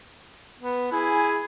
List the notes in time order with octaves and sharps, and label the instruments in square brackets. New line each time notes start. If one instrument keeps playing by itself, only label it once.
[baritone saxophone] B3
[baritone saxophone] E4 [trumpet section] G#4 G#5